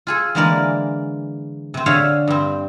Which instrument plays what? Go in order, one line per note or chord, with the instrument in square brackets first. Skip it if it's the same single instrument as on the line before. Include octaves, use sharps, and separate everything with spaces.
[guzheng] F4 G#4 A4
D3 E3 G#3 A#3 A#4 D5
C3 C4
D3 G#4 C#5 E5 F5
G2 C4